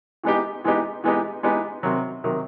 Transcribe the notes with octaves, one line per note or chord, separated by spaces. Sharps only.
E3 G#3 B3 D#4 G4
E3 G#3 B3 D#4 G4
E3 G#3 B3 D#4 G4
E3 G#3 B3 D#4 G4
C3 D#3 F#3
C3 D#3 F#3